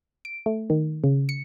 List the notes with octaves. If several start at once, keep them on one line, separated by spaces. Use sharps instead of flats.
D7
A3
D#3
C#3
C#7